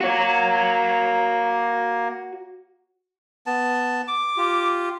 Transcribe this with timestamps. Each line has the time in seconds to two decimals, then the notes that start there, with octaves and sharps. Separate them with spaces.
0.01 A#3 F#4 C#5
3.46 B3 A5
4.08 D6
4.37 F4 G4